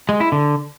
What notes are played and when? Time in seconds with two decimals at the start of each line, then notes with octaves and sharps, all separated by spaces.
0.09 G#3
0.20 E4
0.32 D3